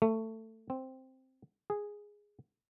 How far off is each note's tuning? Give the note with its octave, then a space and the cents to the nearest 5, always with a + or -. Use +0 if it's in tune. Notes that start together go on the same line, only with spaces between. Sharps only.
A3 +15
C4 +0
G#4 -5